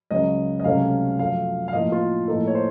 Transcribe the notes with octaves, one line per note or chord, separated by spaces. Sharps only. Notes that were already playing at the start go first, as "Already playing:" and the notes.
C#2 C#3 F#3 D#5
D#5
C#2 C3 F#3 A3 C#4 F5
F#2 F3 A3 F5
F5
A2 F3 A#3 D#4 D#5
F4
A2 F3 A#3 D#4 A4
C#5
C5